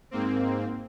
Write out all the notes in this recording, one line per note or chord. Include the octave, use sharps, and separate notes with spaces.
G#2 A#3 C4